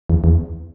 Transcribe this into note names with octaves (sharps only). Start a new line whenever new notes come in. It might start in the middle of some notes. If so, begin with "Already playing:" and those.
E2
E2